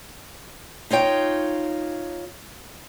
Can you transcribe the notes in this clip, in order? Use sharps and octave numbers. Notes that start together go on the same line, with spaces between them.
D#4 F4 C#5 G5